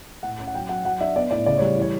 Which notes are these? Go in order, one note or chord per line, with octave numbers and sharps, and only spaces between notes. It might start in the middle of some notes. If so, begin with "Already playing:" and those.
A2 F#5
C#4
F#5
F#3 G5
F#3 F#5
F#3 F#5
D4 E5
B3 D5
A2 D5
C#3 D5
G3 C#5
E3 C#5